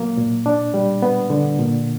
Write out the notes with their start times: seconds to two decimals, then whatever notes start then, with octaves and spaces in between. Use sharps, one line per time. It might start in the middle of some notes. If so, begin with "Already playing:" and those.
Already playing: F#3 A#3
0.17 A#2
0.46 D4
0.74 G3
1.02 B3
1.30 D3
1.59 A#2